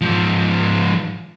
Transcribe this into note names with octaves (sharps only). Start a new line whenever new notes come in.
G#2 F3